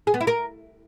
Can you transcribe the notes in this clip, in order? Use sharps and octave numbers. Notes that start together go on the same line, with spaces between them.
G#4
B3
E4
A#4